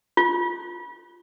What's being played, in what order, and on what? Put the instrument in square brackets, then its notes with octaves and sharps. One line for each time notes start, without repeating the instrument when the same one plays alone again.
[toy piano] F4